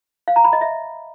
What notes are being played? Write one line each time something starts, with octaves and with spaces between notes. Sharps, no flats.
F5
A#5
B5
D#5
E5